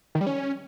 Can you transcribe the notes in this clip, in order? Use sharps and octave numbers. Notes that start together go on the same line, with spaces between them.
D#3
G3
C#4